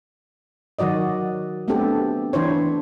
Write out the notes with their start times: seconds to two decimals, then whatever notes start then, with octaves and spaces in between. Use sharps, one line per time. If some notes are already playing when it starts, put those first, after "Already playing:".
0.79 D#3 F#3 F#4 D5 D#5
1.68 A3 B3 C4 D4 G4 A4
2.33 E3 D4 E4 C5 C#5